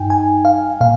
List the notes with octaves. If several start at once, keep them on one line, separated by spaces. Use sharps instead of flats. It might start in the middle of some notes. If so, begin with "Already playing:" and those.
Already playing: G2 D#4 G5 G#5
G#5
F5
A#2 F5